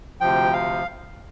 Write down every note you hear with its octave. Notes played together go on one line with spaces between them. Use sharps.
D2 C3 F3 G5
F5